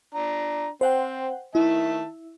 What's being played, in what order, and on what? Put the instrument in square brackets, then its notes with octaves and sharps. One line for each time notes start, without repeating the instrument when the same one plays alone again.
[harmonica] D4 A#5
[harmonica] C4 [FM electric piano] C5 F#5 G5
[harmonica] D#3 E5 A5 [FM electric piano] E4